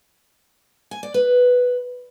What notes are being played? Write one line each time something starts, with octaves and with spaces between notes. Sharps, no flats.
G#5
D5
B4